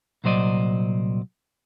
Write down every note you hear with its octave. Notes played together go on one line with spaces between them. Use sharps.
C2 A#2 F#3 C5 D5 D#5